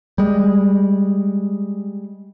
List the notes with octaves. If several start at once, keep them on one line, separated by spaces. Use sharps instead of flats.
G3 G#3